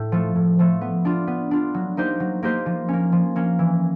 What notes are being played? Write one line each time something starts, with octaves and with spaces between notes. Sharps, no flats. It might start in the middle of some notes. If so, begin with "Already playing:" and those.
Already playing: A2
F3 A3
A2
F3 A3
B3
D4 F4
B3
D4 F4
F#3
A#3 D#4 G4 C5
F#3
A#3 D#4 G4 C5
F3
A#3 C#4
F3
A#3 C#4
E3